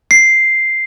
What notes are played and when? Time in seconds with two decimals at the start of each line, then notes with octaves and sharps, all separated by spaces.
0.11 C7